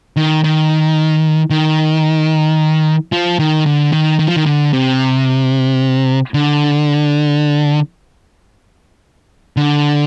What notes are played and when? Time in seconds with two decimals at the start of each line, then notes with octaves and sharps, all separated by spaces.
0.17 D#3
0.44 D#3
1.50 D#3
3.12 F3
3.39 D#3
3.66 D3
3.92 D#3
4.19 D#3
4.27 F3
4.37 D#3
4.46 D3
4.73 C3
6.34 D3
9.57 D3